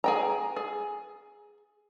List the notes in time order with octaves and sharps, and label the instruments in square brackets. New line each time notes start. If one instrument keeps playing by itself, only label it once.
[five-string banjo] G#4 G5 A#5
G#4